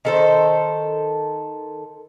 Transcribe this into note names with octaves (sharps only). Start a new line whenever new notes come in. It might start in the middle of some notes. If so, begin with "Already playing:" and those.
D#3 A4 C5